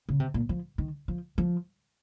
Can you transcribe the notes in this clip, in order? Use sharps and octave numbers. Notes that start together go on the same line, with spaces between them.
C#3
C3
A#2
F3
D#3
F3
F3